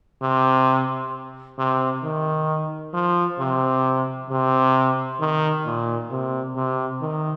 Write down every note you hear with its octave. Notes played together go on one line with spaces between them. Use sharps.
C3
C3
D#3
F3
C3
C3
D#3
A#2
C3
C3
D#3